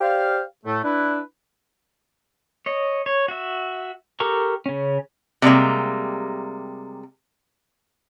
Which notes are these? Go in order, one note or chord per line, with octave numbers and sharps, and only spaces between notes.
G4 C5 D5 F5
A2 A3
D4 E4 B4
C#5 D#5
C#5
F#4 E5
G4 A4 A#4 A#5 C#6
C#3 C#4
C3 G3 G#3 A#3